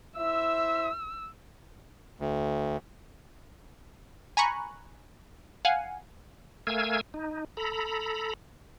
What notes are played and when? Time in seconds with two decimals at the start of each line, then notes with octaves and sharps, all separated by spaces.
0.17 E4 C5 E5 E6
2.20 D2
4.37 G#5 A#5 B5 C#6 F#6
5.65 F5 F#5 G#5
6.67 A3 A#4 F5 G#5 E6 G#6
7.14 D#4
7.57 A4 A#5 B5